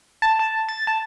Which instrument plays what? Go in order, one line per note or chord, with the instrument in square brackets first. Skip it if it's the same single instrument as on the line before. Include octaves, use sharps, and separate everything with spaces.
[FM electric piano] A5
A5
A6
A5